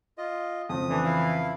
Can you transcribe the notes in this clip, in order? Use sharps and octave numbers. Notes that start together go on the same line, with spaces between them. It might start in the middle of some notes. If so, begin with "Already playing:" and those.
F4 D#5
F2 C#3 D#6
E3 A3 D4
E4 F5